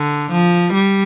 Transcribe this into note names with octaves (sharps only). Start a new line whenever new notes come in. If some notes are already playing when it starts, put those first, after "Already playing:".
Already playing: D3
F3
G3